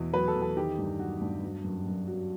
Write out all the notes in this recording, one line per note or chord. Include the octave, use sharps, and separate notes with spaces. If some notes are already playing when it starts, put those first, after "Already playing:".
Already playing: E2 B2 E3
F#3 B4
A4
E2
A4
D#3 G4
G2
F#3 F#4
G2
F#3
F#2
F#2
F#3